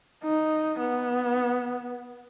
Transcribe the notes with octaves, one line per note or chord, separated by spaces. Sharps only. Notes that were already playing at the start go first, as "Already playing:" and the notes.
D#4
B3